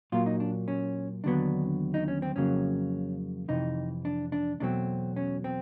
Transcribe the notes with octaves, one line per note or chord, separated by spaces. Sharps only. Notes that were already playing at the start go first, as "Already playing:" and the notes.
A#2 F#3 A#3 F4
D#4
D4
C#4
D#2 D3 F#3 B3 D4
D#4
C#4
C4
F2 C#3 F#3 A#3 C#4
F2 C3 E3 D#4
D4
D4
E2 B2 F#3 A3 C4 D4
C#4
C4